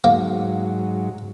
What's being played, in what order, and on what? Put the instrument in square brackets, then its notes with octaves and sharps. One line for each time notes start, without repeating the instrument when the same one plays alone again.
[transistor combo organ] G#2 F#3 [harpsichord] A#3